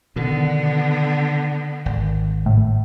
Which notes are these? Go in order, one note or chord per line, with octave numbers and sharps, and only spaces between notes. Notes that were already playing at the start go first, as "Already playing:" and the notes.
B2 D3 D#3 B3
G#1
A2